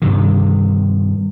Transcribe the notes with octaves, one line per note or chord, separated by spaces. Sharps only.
G2 C3 D#3